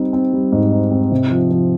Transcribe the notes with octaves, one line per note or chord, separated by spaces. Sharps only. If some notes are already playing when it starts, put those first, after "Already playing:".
Already playing: G3 C4 D#4
C4
G3
G#2
D#4
C4
C3
F3
F3